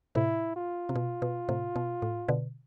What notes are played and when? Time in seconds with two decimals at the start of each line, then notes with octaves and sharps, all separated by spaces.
0.15 A2 C3 E4
0.56 F4
0.89 C3
0.95 B2
1.22 B2
1.49 A2 C3
1.76 B2
2.02 A2
2.28 B2 D3